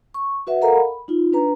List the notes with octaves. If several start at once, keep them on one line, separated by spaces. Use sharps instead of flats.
C#6
F#4 B4 E5 F#5
A4 A#4 D#5 F5 F#5 A#5
B5
D#4 F4
D4 B4 A#5